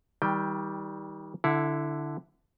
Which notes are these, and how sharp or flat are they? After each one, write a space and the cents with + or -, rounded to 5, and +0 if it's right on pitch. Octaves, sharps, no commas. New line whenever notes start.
D#3 +35 G3 +0 G5 +10
D3 +0 E4 +0 F#5 -40